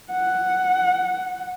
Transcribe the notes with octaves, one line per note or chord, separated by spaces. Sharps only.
F#5